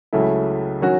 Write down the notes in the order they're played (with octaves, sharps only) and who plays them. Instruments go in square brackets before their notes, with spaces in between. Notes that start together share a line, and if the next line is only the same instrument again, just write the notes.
[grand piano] C#2 C#3 F#3 A3 E4
D#3 F#3 C#4 F#4